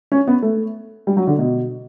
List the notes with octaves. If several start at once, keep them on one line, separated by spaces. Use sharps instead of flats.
C#4
B3
A3
G3
F#3
D3
B2